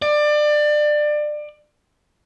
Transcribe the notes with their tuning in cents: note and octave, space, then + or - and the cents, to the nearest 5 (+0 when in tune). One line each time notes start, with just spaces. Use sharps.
D5 +25